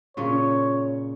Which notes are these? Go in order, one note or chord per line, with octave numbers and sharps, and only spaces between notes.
A#2 C#3 C#4 C#5